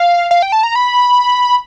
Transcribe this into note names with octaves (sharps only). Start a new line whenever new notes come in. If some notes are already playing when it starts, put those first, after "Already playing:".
Already playing: F5
F5
G5
A5
A#5
B5